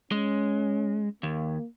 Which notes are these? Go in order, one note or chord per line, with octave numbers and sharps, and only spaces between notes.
G#3 C#4
D#2 A#3